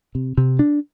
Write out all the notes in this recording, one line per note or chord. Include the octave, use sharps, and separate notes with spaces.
C3
C3
D4